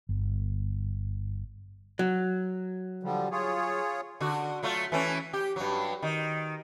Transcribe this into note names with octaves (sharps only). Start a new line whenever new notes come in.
G1
F#3
D3 F3 G3
F4 G#4 C#5
D3 F#4
F#3 A3 F4
E3 A3 C#4
G4
G2 F#3
D#3